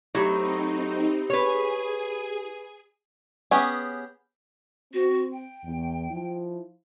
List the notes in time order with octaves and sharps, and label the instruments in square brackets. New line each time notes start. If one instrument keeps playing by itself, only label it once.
[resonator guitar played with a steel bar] F#3 A3 [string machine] C4 D#4 [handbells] E4 G4 B5
[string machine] G#4 G#5 [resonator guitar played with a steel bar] B4 C#5
[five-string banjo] B3 C#4 G4 G#4
[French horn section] C4 [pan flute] F#4
[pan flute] G5
[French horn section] E2
F3 E4